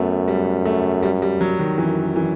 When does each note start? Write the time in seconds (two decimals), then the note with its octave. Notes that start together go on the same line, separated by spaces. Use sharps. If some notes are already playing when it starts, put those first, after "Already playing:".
Already playing: F#2 A3 B3
0.28 G3
0.65 A3
1.02 G3
1.22 G3
1.41 F#3
1.59 D#3
1.77 F#2 E3
2.16 E3